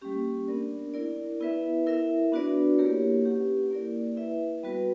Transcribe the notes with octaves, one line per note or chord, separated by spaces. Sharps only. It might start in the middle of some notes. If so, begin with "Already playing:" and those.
G3 A#3 C#4 G4
B3 D4 A#4 D5
E4 A#4 D5
B3 E4 B4 E5
E4 A#4 E5
B3 D4 F#4 B4 D5
A#3 E4 G4 A#4 C#5
C#4 G4 B4 F#5
A#3 E4 A#4 D5
E4 B4 E5
G3 B3 F#4 B4